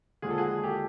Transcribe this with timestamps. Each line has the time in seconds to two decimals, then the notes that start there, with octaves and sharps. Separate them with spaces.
0.22 D#2 D3 F3 G#3 G#4
0.31 A4
0.38 F#4 G#4
0.63 G4 A4